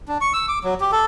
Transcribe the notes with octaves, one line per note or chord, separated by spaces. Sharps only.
D4
C#6
E6
D6
F#3
G4
A4